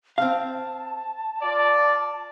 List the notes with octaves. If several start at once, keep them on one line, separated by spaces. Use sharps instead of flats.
C4 F5 A5
F4 D5